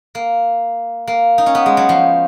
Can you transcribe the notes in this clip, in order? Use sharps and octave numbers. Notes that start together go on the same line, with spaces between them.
A#3
A#3
D#4
C#4
B3
G#3
F#3
F3